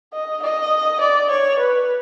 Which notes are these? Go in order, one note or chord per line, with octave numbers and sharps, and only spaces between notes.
D#5
D#5
D5
C#5
B4